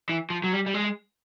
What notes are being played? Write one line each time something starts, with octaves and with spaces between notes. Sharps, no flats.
E3
F3
F#3
G3
G3
G#3